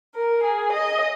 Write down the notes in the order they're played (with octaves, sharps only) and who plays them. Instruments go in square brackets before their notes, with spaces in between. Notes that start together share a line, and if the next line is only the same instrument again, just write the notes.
[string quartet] A#4
G#4
D#5